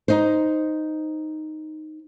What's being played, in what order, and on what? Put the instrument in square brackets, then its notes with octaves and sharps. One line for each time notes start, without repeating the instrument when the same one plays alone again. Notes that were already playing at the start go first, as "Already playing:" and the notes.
[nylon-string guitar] D#4 C5